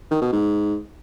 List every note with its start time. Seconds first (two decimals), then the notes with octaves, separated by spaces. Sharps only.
0.11 D#3
0.22 B2
0.32 G#2